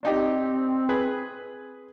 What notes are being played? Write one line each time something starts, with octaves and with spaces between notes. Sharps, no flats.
C4 D4 D#4 G4
G#4 B4